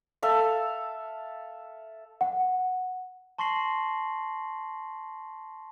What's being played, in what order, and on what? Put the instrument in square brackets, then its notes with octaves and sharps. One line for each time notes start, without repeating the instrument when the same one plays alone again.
[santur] A4 E5 F5
[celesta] F#5
[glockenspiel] A5 C6 C#6 A#6 C7 F#7